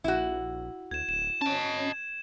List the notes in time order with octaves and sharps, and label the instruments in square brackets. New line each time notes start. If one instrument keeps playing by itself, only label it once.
[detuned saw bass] A#1 [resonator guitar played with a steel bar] E4 F#4
[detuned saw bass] D2 [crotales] G#6 E7
[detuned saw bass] D1 [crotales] E7
[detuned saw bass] C#4 [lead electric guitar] D#5 A5